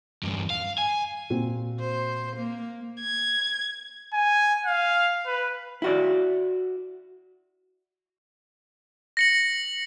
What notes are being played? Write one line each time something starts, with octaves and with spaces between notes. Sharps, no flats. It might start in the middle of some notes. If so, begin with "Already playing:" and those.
E2 G2
F5
G#5
A#2 C4 F#4
C5
A#3
G#6
G#5
F5
B4
E4 F#4 D5
A#6 C#7 F#7